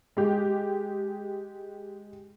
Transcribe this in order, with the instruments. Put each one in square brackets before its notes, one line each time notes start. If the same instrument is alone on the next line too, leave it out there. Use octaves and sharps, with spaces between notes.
[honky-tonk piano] G#3 G4